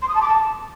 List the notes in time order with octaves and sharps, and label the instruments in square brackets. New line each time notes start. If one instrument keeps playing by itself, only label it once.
[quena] C6
D#6
A5
D6
A5